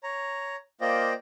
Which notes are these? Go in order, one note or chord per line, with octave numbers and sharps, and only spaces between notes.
C#5 A#5
A#3 F4 C5 D5 D#5 G5